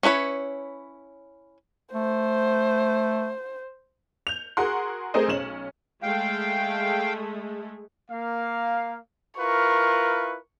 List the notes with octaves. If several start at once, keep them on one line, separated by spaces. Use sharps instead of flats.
C#4 E4 B4 C#5
A3 C5
G6 F7
F#4 G#4 A#4 F#5 C6
A3 C4 G#4 A#4 C5 D#5
B1 C#4 E7 F#7
G#3 A3 F5 G5
A#3 F5
E4 F4 A#4 B4 C#6